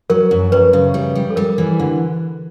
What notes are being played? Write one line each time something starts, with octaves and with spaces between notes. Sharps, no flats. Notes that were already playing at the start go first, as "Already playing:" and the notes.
F#3 A#4
F#2
F#2 B4
C#3
G3
G3
A4
G3 A#4
E3
D3